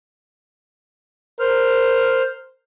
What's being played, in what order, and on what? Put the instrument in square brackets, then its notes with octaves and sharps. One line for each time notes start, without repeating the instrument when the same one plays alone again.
[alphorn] A#4 [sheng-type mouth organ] C5 F6